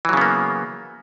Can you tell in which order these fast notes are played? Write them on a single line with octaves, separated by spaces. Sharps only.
E3 F#3 C#3 B3 A#3